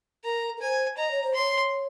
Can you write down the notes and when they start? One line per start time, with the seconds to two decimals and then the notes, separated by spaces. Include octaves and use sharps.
0.24 A#4 A#5
0.57 A#4
0.62 C5 G#5
0.97 D#5 A#5
1.11 C#5
1.24 C5
1.34 C#5 C6